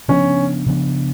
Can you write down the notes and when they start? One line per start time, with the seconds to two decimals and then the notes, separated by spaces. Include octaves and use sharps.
0.08 C#3 F3 B3 C#4 D4
0.66 C#3 F3 B3 D4